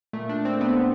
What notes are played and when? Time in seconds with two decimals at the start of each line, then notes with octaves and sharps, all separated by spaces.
0.13 A#2 A3
0.29 D4
0.45 C4
0.61 B3